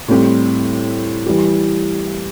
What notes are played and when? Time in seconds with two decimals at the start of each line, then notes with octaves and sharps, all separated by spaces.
0.08 A2 G3 C4 G4
1.26 E3 G3 E4 G4